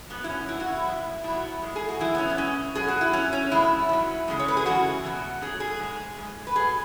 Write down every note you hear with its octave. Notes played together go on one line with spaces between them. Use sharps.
G#2 F#3 B3
E4
C#4
F#2 F#3 E4
F#4
E4
E2 B2 G#3
B2 F#3 E4
G#2 G#3
G#4
F#4
F#2 E3 G#3 E4
B3
C#4
B3
B2 G#3 C#4
B2 F#3 G#4
F#4
E4
F#2 F#3 C#4
C#4
E2 B2 G#3 E4
G#2 F#3
E2 C#3 G#3
C#5
B4
G#4
F#2 C#3 E3 G#3 F#4
E2 B2 F#3
F#2 F#3 G#4
G#4
G#2 G#3
G#2 G#3
B4
B2 F#3 G#4